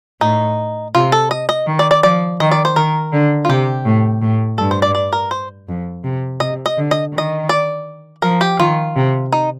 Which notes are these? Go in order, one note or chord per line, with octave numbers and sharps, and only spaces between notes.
A2 D#4
C3 F4
A4
D#5
D#5
D#3
D5
D5
F3 D5
D#3 D#5
D5
C5
D#3 A#4
D3
F4
C3 G4
A2
A2
G2 A4
C5
D5
D5
A#4
C5
F2
C3
C3 D#5
D#5
D3
D#5
D#3 D#5
D5
F3 A#4
G4
D#3 F4
C3
D#4